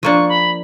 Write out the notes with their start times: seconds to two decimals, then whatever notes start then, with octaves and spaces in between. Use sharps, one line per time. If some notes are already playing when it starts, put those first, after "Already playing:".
0.03 F3 A#3 D4 C#6
0.29 B5